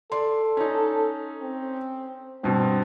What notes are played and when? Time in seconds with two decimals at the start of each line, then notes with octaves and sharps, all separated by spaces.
0.12 A4 D5 C6
0.57 C#4 D#4
1.42 C4
2.44 G2 B2 C4